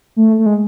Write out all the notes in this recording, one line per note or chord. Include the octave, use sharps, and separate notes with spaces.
A3
A3
G#3